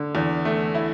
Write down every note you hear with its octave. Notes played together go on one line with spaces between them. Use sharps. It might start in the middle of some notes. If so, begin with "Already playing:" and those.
Already playing: D3
E2
A3
E4